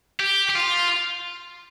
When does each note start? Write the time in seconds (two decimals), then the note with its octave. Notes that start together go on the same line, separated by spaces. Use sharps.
0.20 G4
0.50 G4
0.55 F4